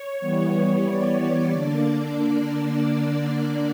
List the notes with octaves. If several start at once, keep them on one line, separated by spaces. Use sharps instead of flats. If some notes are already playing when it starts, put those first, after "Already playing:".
Already playing: C#5
E3 G3 B3
D5
D3 A#3 D4 D5